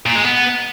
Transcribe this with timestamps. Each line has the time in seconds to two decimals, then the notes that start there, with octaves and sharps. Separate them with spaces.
0.06 A#2
0.15 G#3
0.25 B3